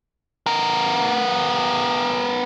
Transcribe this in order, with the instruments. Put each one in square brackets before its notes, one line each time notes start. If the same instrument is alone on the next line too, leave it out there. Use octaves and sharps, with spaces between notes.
[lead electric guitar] B3 A#4